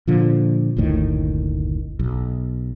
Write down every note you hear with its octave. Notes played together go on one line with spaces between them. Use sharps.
A#2 D3 F3
F#1 D2 A2 D#3
B1